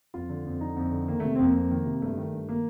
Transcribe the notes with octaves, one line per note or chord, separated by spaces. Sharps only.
F2 F4
D3
F2
D3 D#4
F2
D3
D#3 A#3
C3 A3
C4
F2 A#3
F2
D#3
C3
G2 A3
D#3
G2
D#3 A#3